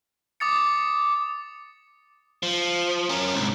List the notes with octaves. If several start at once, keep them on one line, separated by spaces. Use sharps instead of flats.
D6 D#6 A6 C#7
F3
C#4 A#4
C2 G#2